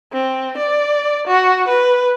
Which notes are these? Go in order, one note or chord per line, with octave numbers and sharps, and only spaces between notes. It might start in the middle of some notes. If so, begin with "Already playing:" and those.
C4
D5
F#4
B4